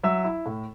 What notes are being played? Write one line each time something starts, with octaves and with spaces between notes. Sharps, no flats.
F#3 E5 E6
E4
A2